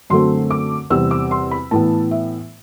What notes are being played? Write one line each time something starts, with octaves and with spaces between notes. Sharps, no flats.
F#2 D3 F#3 A3 C4 C6
D6
E2 C3 G3 C4 E6
D6
C6
B5
A2 E3 B3 A5
E5